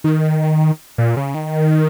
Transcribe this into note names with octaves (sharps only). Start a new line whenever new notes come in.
D#3
A#2
C#3
D#3